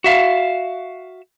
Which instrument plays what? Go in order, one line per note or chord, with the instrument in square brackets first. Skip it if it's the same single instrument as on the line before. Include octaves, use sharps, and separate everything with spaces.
[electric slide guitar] F#4 E5 F5